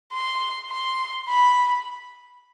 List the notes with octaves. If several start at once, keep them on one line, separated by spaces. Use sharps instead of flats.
C6
C6
B5